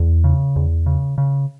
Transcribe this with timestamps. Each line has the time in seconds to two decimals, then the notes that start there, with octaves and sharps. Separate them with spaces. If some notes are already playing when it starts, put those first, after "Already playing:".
Already playing: E2
0.24 C#3
0.56 E2
0.86 C#3
1.18 C#3